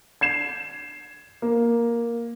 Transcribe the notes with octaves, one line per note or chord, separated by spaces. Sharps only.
G#6 C7 E7
A#3